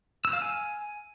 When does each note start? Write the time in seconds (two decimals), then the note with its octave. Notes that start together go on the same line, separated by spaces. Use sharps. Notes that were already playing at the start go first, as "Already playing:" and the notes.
0.25 E6
0.33 F5
0.42 G#5